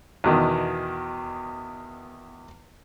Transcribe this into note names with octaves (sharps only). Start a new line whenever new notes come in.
E2 B2 D#3